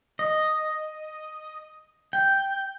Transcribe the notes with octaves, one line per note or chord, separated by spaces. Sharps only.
D#5
G5